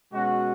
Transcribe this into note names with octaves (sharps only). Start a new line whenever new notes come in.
B2 G#3 C#4 F#4